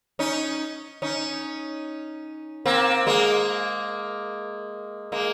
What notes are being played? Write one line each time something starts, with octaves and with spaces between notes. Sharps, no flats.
C#4 D#4
C#4 D#4
A#3 C4
G#3 A#3
G#3 A#3